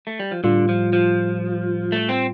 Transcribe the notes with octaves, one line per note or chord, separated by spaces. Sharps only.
A3
G3
F3
A2 D3 G3 F4
F3
F3
A3
C4